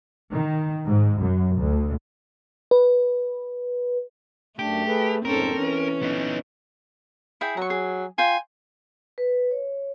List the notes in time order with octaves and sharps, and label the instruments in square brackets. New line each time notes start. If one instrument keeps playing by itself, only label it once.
[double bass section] D#3
G#2
F#2
D2
[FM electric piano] B4
[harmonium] F#2 D4 [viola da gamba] A3 [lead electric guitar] G4
[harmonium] G#4 A4 B4
[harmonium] F2 G#2 [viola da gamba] C4 C#4 A4 [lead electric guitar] A#4
[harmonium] E3 [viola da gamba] C#4
[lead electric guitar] B3 D#4
[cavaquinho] E4 G#4 G5
[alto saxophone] F#3 [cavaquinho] A#5 C#6
[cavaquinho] G#4
[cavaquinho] F4 G5 [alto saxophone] G#5
[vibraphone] B4
C#5